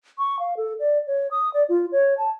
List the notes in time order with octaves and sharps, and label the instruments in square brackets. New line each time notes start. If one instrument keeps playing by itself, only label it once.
[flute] C#6
F5
A4
D5
C#5
D#6
D5
F4
C#5
A5